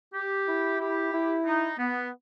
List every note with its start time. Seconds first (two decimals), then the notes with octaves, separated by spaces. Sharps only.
0.14 G4
0.47 E4
0.80 G4
1.13 E4
1.46 D#4
1.79 B3